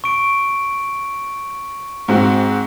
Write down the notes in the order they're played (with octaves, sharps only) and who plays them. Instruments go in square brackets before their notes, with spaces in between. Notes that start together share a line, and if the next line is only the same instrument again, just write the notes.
[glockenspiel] C#6 D7
[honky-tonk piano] G#2 C4 F#4